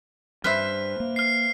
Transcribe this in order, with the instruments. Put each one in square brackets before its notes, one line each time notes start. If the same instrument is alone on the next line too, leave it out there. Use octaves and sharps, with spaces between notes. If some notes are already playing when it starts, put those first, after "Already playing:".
[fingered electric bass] G2 [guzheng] B4 C5 E5 [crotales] F6
[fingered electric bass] A#3
[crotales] F6 C7